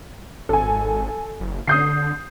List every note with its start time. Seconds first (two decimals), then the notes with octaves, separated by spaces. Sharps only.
0.49 G#1 A4 G#5
1.40 F#1
1.67 D3 D#6 G6 C7